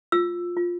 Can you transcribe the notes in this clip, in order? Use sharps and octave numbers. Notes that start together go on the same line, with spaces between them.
F4 E6
F4